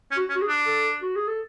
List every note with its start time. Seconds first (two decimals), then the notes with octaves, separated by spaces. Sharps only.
0.12 C#4
0.17 F#4
0.29 C#4
0.36 F#4
0.42 G#4
0.48 D4
0.66 A4
1.02 F#4
1.16 G#4
1.28 A4